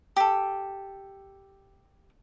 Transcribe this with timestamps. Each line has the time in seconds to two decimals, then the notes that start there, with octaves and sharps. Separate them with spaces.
0.16 G4 A4